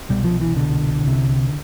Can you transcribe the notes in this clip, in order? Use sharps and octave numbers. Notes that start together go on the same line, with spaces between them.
C2 B2 G3
F3
E3
C2 B2 D3
C2 C3